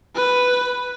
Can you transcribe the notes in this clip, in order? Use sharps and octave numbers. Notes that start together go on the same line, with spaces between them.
B4